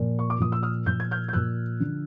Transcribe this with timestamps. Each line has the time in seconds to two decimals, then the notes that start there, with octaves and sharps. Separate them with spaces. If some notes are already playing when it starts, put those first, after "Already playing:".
Already playing: A#2 F3
0.19 C#6
0.30 D6
0.39 A#2 F3 D#6
0.52 E6
0.63 D#6 F6
0.86 A#2 F3 G6
1.00 G#6
1.11 F6 G6
1.28 G6
1.33 A#2 F3 E6 F#6
1.80 D3 F3